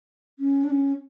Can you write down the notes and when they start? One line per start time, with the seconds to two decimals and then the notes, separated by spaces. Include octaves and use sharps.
0.39 C#4
0.64 D4
0.70 C#4